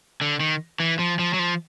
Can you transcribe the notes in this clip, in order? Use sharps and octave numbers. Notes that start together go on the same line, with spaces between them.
D3
D#3
E3
F3
F3
F#3
F3